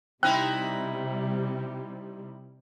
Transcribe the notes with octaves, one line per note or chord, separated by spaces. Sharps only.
C3 G3 C4 D#4 E4 G5 F#6